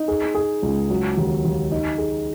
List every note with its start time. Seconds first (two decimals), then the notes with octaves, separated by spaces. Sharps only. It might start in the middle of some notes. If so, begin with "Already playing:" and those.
Already playing: D#4
0.08 G#4
0.35 G#4
0.63 C#2
0.90 F#3
1.17 D#2
1.45 D#2
1.71 D#4
1.98 G#4